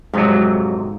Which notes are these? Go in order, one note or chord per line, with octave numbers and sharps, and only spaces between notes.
F2 G#2 C3 F#3 D#4